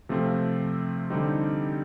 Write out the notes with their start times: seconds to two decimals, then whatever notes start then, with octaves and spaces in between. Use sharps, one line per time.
0.09 C3 F3 A3 C4 F4
1.10 D3 G3 C4 D#4 G4